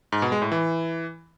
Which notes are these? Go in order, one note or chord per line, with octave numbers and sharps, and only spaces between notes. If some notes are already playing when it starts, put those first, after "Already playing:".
G#2
B2
G#3
A2
E3